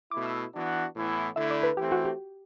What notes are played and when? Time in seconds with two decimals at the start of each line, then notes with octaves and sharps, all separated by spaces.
0.11 B2 A3 E4 D6
0.26 E6
0.53 E3 B3 D4 F#4
0.95 A2 E3 B3 E4
1.36 D3 A3 E4 E5
1.51 D5
1.63 B4
1.77 E3 A3 C4 G4
1.92 F#4
2.05 G4